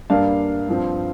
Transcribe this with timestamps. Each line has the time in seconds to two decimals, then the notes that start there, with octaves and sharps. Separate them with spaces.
0.10 G2 G3 A#3 D4 F5
0.69 G2 F3 C4